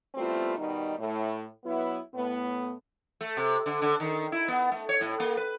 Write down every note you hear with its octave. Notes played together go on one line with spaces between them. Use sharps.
G3 A3 B3 C4 E4 F4
B2 D#3 G3 D#4
A2
F#3 B3 E4
A2 B3
A3
C3
D3
D3
D#3
E4
B3
A3
C#5
A2
A#3
B4